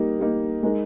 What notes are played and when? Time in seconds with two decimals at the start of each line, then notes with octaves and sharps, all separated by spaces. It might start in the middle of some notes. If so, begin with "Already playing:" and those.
Already playing: G3 A#3 D#4
0.19 G3 A#3 D#4
0.63 G#3 D#4 A#4